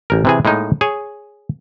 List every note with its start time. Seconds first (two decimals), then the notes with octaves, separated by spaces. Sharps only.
0.10 A1 A#4
0.25 C3 E3 G#4
0.45 A2 G#3 A#3 D#4
0.81 G#4 C#5